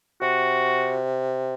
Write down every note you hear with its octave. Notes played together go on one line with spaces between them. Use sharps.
C3 F#4